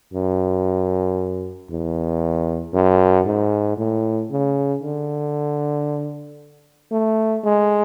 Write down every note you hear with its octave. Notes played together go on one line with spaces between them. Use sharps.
F#2
E2
F#2
G#2
A2
C#3
D3
A3
G#3